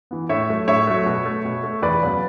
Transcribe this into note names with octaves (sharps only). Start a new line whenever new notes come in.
E3 B3
A2 C#5 E5
F#3 A3
A2 C#5 E5
F#3 A3
B2
A3
B2
A3
E2 B4 D5
C#3 F#3 B3